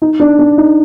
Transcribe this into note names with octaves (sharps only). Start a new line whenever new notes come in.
D#4
D4
D4
D#4